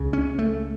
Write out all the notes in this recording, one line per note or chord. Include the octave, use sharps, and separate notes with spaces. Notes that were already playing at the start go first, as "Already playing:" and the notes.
Already playing: C#2 C#3
C#4
A3